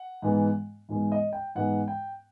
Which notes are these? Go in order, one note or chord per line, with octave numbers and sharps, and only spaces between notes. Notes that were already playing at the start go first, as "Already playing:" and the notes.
Already playing: F#5
G#2 E3 G#3 B3
G#2 E3 G#3 B3
D#5
G5
G#2 E3 G#3 B3 F#5
G5